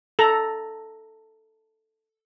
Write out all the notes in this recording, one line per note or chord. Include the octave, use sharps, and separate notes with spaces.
A4 A#5